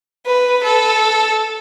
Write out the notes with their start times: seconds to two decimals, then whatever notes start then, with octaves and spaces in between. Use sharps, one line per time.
0.26 B4
0.64 A4